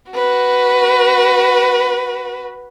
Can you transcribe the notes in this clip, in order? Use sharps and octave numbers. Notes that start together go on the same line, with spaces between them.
F#4 B4